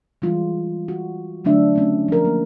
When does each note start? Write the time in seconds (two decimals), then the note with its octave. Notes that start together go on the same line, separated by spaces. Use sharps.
0.22 E3 G3 G#3 F4
0.88 F#4
1.45 D3 F#3 A3 D4 E5
1.75 A3 C#4
2.08 F3 A#4
2.25 A#3